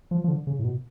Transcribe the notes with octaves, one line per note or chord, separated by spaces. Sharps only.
F3
F3
D3
C#3
A2
B2